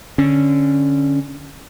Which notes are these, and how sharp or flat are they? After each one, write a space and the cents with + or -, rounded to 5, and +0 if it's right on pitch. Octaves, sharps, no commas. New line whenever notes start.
D3 +0 C#4 +0